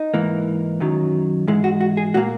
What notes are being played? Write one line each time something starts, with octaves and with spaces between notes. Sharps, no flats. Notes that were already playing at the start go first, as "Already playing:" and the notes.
Already playing: D#4
G#2 E3 A#3
F#2 D#3 F#3
G#2 E3 G#3
F#4
F#4
G#4
A#2 A#3 F#4